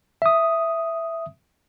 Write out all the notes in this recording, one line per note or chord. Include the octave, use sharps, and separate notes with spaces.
E5 D#6